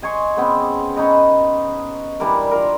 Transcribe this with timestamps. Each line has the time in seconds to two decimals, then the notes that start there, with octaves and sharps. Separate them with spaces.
0.02 D#5 G#5 C6 C#6
0.37 C#3 B3 C4
0.96 C#4 D#4 B4 D#5
2.20 E3 G3 D4 A#4
2.51 F4 A#4